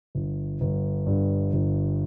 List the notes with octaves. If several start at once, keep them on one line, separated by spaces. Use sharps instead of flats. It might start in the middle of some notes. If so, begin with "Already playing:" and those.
G1
G1
G2
G1